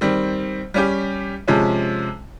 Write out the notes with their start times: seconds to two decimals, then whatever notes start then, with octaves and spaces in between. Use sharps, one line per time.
0.01 D#3 G3 C4
0.74 G3 C#4 G4
1.48 C3 F3 G#3 C#4